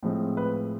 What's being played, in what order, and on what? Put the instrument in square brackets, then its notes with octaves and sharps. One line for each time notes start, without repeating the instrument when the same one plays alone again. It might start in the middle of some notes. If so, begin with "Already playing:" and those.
[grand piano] A2 F3 G#3 C4
B4